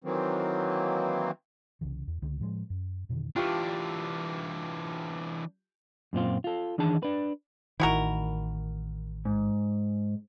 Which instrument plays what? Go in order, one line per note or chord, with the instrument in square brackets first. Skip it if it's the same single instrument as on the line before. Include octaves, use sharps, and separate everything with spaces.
[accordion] D#3 E3 F#3 A#3 C4
[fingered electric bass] C2 C#3 E3
E2
C#2 D3 A3
A2 F3 F#3 G#3
F#2
F2 B2 D3 D#3
[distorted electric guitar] E3 D4 [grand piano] F4 G4 C#6
[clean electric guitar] F#2 A#2 C4 F4
F4 A4
D#3 E3 D4 G#4 A5
D4 B4
[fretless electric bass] A1 D#3 [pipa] E4 F#4 A#4
[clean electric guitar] G#2